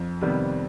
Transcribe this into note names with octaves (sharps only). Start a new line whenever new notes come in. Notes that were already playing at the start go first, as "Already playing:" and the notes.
Already playing: F2
C3 D#3 G3 B3